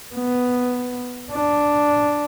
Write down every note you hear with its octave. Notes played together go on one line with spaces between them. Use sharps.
B3
D4